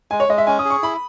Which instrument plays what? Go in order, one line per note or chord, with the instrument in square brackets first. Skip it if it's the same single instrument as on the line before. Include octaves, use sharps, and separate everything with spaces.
[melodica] G#3 [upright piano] G#5
[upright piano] C#5
[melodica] G#3 [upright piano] D#5
[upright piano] E5
[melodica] C#4 [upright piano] G#5
[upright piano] D#6
[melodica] G#4
[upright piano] C#6
[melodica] E4 [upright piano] B5